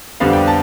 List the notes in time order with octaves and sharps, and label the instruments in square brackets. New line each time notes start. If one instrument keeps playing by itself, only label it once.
[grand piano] F2 D3 G3 B3 D4 F5
G5
A5